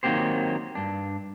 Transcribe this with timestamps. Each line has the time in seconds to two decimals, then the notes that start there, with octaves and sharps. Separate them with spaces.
0.03 D#3 F#3 A#3 C4 G4 C5
0.75 G2 D4